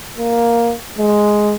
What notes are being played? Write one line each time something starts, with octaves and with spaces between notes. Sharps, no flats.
A#3
G#3